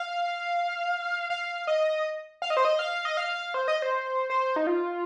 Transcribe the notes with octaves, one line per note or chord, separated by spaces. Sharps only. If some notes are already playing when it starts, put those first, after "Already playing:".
Already playing: F5
F5
D#5
F5
D#5
C5
D#5
F5
D#5
F5
C5
D#5
C5
C5
D#4
F4